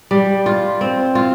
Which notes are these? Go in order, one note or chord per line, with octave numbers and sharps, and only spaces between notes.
G3
F4
C4
F4